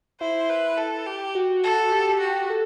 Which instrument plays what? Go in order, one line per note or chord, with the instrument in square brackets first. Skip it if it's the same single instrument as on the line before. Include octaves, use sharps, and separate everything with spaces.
[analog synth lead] E4 [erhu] C5
[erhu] B4
A4
G4
[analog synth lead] F#4
[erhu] A4
[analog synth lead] G4
[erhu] F#4
[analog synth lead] A4